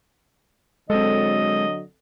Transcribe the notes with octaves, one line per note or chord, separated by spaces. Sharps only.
D3 F#3 G#3 C4 A4 D#5